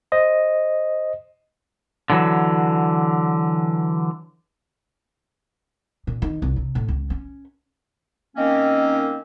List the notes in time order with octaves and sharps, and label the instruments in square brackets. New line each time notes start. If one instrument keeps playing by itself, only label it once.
[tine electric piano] C5 D#5
[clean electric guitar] D3 E3 F#3
[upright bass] A#2
D#3
C2
C3
A2
C#2
C#4
[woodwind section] D#3 A#3 C4 C#4